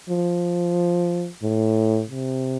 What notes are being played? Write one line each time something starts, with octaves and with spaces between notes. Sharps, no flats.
F3
A2
C3